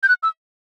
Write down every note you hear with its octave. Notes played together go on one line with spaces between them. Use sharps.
G6
F#6
E6